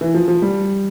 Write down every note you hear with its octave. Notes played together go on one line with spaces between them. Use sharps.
E3
F3
F3
G3